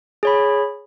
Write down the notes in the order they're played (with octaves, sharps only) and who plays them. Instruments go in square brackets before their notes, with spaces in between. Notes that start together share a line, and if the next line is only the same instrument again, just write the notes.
[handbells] G#4 C#5 B5